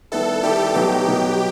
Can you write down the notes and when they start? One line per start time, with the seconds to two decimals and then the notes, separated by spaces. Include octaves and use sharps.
0.12 D#3 G3 B3 E4 A4
0.43 D#3 G3 B3 E4 G4
0.75 B2 F#3 B3 D#4 G4
1.05 B2 F#3 B3 D#4